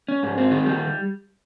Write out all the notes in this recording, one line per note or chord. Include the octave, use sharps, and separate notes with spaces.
C#4
G#2
C4
D#3
G3